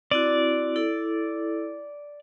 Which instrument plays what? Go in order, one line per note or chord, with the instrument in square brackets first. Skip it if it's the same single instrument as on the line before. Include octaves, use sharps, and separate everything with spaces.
[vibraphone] C4 E4 F#4 [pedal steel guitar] D5
[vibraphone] E4 A4